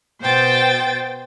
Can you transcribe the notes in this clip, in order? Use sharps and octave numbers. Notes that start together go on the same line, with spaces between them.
B2 C5 G5 A6